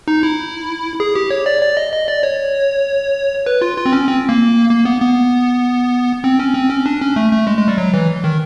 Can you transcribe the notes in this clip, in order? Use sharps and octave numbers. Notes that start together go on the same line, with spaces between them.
D#4
E4
G#4
G4
C#5
D5
D5
D#5
D#5
D5
C#5
B4
F4
F4
C4
C#4
C4
A#3
A#3
B3
B3
C4
C#4
C4
C#4
D4
C#4
A3
A3
G#3
G#3
G3
F#3
E3
D#3